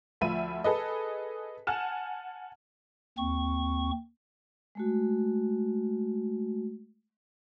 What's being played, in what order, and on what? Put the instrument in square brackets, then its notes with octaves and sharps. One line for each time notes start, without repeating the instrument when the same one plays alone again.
[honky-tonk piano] D2 F3 E5 B5 D#7
G#4 A4 B4 D#5
F#5 G#5 A5 F6 E7
[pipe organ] D#2 C4 C#6
[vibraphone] G#3 A3 F#4